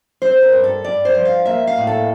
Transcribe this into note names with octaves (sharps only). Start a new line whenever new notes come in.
C4 C5
A#4
G2
A4
G2 D5
C5
F3
F5
A#3 E5
F5
A2
A4